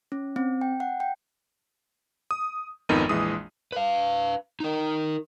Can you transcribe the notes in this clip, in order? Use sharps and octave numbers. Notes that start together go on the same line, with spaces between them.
C#4
C4
G5
F#5
G5
D#6
G#1 F2 B3 D#4 A#4 D#7
A#1 E3 G#3 D#6
B4 F5
D#4 A#4